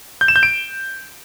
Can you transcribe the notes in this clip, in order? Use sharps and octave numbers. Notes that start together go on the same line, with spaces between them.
G6
E7
G6
D7